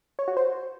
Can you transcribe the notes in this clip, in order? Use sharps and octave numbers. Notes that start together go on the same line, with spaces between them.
C#5
F#4
C5